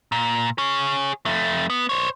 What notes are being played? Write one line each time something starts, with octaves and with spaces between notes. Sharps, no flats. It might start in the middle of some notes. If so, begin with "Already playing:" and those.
A#2
G#4 C#5
F2 A3
B3
C5 C#5